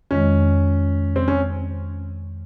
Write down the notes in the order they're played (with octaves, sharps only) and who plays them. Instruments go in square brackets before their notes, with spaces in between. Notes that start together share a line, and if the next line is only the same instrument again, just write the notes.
[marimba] F2 D#3 G#3 [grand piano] C#4
[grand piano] C4
C#4